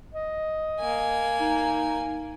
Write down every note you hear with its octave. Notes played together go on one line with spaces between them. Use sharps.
D#5
A#3 G#5
D#4